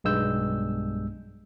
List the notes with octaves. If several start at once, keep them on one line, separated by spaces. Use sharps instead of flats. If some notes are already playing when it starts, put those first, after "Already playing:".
B1 G2 G#3 E6 G6